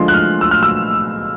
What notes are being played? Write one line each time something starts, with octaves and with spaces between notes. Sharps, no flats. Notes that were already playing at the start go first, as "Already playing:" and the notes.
Already playing: D3 F3 G#3 C6
F#6
F6
E6
F6
E6